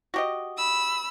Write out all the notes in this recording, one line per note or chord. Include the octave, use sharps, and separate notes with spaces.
F#4 G4 D#5
B5 E6